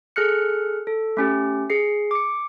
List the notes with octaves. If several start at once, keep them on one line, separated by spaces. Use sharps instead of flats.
G#4 A4 F6 F#6 C#7
A4
A3 C#4 G4
G#4 C7
D6 C#7